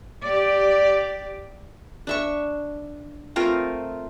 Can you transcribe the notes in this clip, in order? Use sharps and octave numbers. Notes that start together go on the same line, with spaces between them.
G4 D5
D4 E5 C#6
A3 C4 F4 A#4